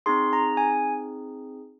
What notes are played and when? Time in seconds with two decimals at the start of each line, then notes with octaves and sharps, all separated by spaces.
0.06 C4 D#4 G#4 C6
0.33 A#5
0.57 G#5